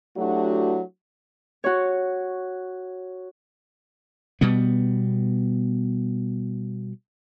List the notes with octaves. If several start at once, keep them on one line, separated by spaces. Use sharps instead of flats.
F#3 A3 D4 E4 F#4 G4
F#4 C#5
B2 G3 B3